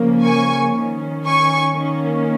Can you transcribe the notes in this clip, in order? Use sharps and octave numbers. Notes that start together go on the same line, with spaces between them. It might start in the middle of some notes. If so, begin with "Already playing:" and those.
Already playing: C#3 F3 A#3 C#4
G#5 C#6
D#3 C#4
G#5 C#6
D#3 A#3 C#4